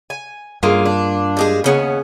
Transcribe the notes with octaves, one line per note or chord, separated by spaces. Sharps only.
G#5
G2 F#3 G#3 A#3 C#4 F4
D4
G3 G#3 G#4
D#2 C#3 B3 C#4 F#5